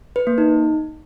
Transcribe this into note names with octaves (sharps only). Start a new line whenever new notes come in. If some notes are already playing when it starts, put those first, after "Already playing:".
B4
A#3
D#4